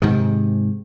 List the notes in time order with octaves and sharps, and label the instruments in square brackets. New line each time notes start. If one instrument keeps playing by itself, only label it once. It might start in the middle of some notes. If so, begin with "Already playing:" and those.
[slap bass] G#2 C3 D#3